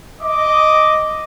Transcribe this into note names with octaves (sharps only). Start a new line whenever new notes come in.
D#5 D6